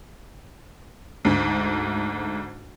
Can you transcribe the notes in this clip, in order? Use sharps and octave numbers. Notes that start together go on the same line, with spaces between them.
D2 G#2